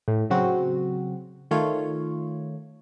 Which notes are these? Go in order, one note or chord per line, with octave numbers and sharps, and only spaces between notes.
A2
C#3 F#3 C4 F#4
D#3 A3 F4 C#5